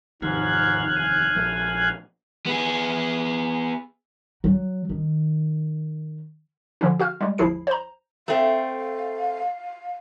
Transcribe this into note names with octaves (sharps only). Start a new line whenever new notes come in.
F1 D#2 G#2 F5 F6 F#6 G#6
F5 G#5
A#1 A3
B3 G#4
F#3
D#3
D3 F3 C#4
F#4 F5 F6
G3 G#3
G1 D#2 F3 E4 G#4 C7
C5 A#5
A3 C4 F5